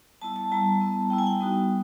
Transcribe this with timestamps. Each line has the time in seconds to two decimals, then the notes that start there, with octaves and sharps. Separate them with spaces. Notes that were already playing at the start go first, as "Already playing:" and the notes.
0.21 G3 B3 E4 A5
0.36 A5
0.51 G3 B3 E4 A#5
0.81 G3 B3 E4
1.10 G3 B3 E4 G5
1.18 G#5
1.27 G5
1.40 G3 B3 D#4 F#4